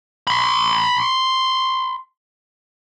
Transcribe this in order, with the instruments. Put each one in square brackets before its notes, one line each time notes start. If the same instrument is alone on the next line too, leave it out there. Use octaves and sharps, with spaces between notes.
[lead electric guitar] B5 C6